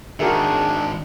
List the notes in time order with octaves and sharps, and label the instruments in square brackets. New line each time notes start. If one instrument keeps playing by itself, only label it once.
[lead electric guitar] G#2 D#3 [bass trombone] D4 [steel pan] F#4 A#4 E5 [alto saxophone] G#4